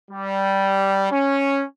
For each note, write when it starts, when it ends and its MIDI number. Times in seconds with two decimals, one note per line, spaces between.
0.11 1.10 55
1.12 1.64 61